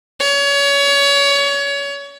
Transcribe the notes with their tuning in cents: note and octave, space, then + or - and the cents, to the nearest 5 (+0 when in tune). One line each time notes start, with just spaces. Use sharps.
C#5 +30